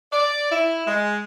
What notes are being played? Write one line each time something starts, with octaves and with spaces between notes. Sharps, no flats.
D5
E4
G#3